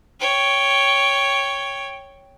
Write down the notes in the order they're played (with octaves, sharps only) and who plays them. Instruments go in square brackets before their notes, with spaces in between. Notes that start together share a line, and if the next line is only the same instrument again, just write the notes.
[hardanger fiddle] C#5 G5